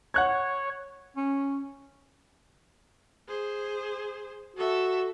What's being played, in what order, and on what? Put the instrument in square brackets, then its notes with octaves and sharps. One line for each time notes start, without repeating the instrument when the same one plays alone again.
[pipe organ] C#5 [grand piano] F#5 F#6 G#6
[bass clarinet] C#4
[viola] G#4 C5
[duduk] F#4 [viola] A4 E5